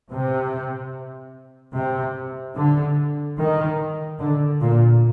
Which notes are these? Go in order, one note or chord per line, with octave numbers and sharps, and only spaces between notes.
C3
C3
D3
D#3
D3
A#2